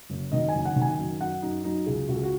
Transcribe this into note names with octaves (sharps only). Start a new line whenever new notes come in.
F#1
D#3 D#5
G#5
F#1
F#5
D#3
G#5
F#2
F#2 F#5
F#2 D#4
F#3 D#4
C#2 G#4
C#2 F#4
G#4
F#4